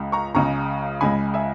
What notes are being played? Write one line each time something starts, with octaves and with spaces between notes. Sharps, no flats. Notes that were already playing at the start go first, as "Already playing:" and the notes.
Already playing: C#2 C#3 G#3
A#5 C#6
C#2 C#3 G#3 A#5 C#6
C#2 C#3 G#3 G#5 B5
E5 G#5